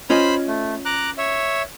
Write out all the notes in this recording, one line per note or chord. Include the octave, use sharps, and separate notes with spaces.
C#4 F4 C5 D#5 B5
A3
A#5 D6 F#6
C#5 E5